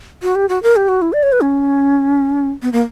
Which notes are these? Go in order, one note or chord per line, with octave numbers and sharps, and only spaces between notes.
F#4
G4
F#4
A#4
G4
F#4
E4
D5
C#5
B4
C#4
B3
A#3